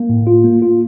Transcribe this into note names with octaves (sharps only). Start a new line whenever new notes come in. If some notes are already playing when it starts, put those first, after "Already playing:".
Already playing: A#3
A2
F4
A#3
F4